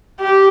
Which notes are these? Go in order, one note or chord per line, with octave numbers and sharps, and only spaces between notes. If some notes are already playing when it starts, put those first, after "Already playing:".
G4